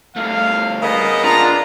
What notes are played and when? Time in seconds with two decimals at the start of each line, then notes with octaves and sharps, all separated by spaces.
0.16 G2 A3 F5
0.83 C#3 A#3 B3 D#5
1.24 D4 F4 A#5